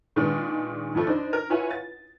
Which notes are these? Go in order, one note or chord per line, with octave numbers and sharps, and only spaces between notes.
A#2 D#3 G#3 B3 D4
F2 F3 A3
D4 D#4 C5
A#4
E4 F4 B4 C#5 F#5 G#5
A6